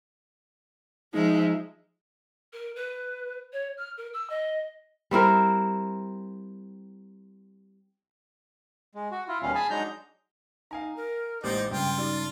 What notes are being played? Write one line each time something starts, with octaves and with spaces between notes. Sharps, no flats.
F3 G#3 D#4 E5
A#4
B4
C#5
F6
A#4
E6
D#5
G3 C4 E4 A#4
G#3
F#4
E4 F4
D#2 B2 G3 C#4 F5
G#4 G#5 A5 B5
F#3 G#3 D4 D#4 A#5 G6
D#4 F5 G#5 A#5
A#4
A1 G#3 A#3 D#4 G4 C5 D5
G2 C#3 D4 F4 G5
D#4 F#4 G4 D5